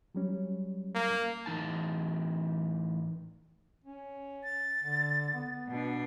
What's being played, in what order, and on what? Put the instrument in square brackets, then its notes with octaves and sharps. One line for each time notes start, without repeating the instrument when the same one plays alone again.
[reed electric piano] F#3 G3 C#4
[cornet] A#3
[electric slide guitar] A2 E3 D#4 A5
[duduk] C#4
[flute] A6
[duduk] D3
B3
[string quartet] B2 D4